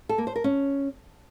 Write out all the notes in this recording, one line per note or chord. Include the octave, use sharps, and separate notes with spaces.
A4
A#3
C5
A#4
C#4